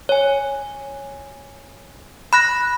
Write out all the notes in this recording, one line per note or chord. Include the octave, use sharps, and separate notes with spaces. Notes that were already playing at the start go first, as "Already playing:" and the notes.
C#5 G#5
B5 F#6 A#6